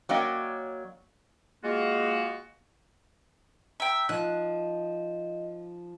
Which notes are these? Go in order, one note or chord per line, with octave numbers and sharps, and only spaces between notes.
F#3 A#3 C#4 D5 D#5 G5
G#3 A#3 F4 F#4
E5 G5 A#5
F3 D#4 D#5 F#6